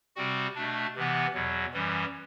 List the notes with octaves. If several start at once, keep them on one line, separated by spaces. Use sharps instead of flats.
C3 G3 C4 F#4
B2 A3 D4
C3 E3 B3
E2 B2 F#3
F#2 E3 G3